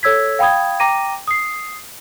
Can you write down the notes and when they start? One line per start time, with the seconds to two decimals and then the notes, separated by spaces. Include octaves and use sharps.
0.03 A4 C#5 E6 G#6 B6
0.39 F5 G5 B5 D#6 G#6
0.80 G5 A#5 D6 A#6 D#7
1.28 D#6 C7